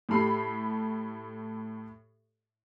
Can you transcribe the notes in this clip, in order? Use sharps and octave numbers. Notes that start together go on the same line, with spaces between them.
A2 G4 A4 B5 C7